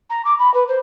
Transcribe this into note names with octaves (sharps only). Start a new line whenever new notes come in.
A#5
D6
B5
B4
C5